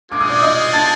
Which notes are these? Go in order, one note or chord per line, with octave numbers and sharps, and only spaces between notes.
G#3 C4 F4 G#4 D6
D#6
D5 D6
D#5 D#6
A5 A6